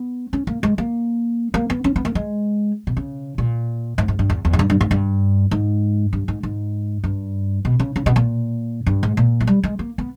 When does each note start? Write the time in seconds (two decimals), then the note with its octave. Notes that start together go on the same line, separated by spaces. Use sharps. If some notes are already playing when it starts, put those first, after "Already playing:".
Already playing: B3
0.33 C#4
0.47 A#3
0.63 G#3
0.78 A#3
1.54 A#3
1.70 B3
1.84 C#4
1.96 B3
2.05 A#3
2.15 G#3
2.87 B2
2.97 C#3
3.38 A#2
3.98 G#2
4.08 G#2
4.19 G2
4.30 E2
4.45 E2
4.53 G#2
4.59 G2
4.70 G2
4.81 G#2
4.91 G2
5.51 G#2
6.13 G2
6.28 G#2
6.43 G#2
7.04 G2
7.65 B2
7.80 C#3
7.96 C#3
8.06 B2
8.16 A#2
8.86 G2
9.03 G#2
9.17 A#2
9.40 E3
9.47 G3
9.63 G#3
9.79 A#3
9.98 B3